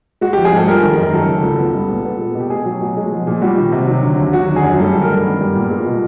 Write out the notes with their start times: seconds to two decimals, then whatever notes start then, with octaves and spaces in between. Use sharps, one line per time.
0.21 G#3 F#4
0.33 F3 G4
0.45 G#4
0.53 G#2 A4
0.67 G3 A#4
0.83 D#3
0.91 A#4
0.98 F#2
1.13 F#3 A4
1.29 C#3
1.44 C#2
1.59 B3
1.75 G3
1.89 A#2
2.05 B3
2.21 G#3
2.35 B2 G4
2.50 A3 G#4
2.66 F#3
2.81 B2
2.97 G#3
3.12 F3
3.27 A#2
3.42 G3 F#4
3.57 D#3
3.72 C3
3.88 F#3
4.03 D3
4.18 D#2
4.33 F#3 F#4
4.49 D3
4.56 G#4
4.64 F#2
4.79 G3 A4
4.95 D#3
5.02 A#4
5.10 G2
5.26 B3
5.41 G3
5.55 A#2
5.71 G#3
5.86 B2